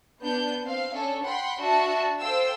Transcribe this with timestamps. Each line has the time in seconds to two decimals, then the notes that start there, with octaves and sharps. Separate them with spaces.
0.20 B3 D4 G6
0.62 C4 F5
0.92 C#4 D4 A4
1.23 F#5 G5 B5 C6
1.60 D4 F#4 E5 A5
2.20 A4 C5 F5 G5 E6